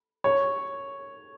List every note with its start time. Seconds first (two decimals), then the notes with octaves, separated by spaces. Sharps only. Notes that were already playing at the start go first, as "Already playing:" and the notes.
0.24 C#5